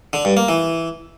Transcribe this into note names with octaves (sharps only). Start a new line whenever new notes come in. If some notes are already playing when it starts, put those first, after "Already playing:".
D3
G2
A#3
E3